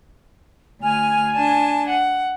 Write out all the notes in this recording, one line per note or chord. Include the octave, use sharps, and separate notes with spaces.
D2 G#5 F6
D4 A5
F#5